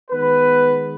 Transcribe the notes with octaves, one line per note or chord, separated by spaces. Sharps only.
D#3 G#3 B3 B4